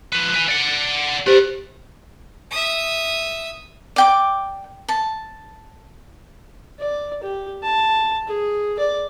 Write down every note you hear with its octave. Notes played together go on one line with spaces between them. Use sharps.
F3 B4
B4 G#5
D5 F#5
G4 B4 C5 D5
E5 D#6
D5 G5 D6
A5
D5
G4
A5
G#4
D5